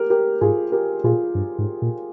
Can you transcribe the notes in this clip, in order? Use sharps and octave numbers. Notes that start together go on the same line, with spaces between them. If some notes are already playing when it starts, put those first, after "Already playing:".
Already playing: G4 A#4
G4 A#4
G#2 F4 G#4
G4 A#4
A#2 F4 G#4
G2
G#2
A#2